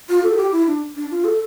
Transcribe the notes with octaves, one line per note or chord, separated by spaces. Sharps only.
F4
A4
F4
G4
E4
D4
D4
F4
A4